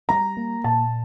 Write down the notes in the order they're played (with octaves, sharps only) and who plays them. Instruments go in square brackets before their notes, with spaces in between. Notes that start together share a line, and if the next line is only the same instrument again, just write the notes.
[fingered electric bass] G3 [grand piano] A#5
[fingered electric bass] A#3
[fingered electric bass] A#2 [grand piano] A5